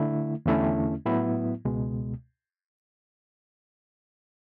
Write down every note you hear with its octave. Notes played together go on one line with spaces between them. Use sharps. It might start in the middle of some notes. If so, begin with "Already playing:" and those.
Already playing: D3 A3 E4
E2 D3 A3 C#4 E4
A2 F#3 B3 E4
C#2 B2 G#3